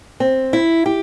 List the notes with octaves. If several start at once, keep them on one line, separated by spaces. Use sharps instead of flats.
C4
E4
G4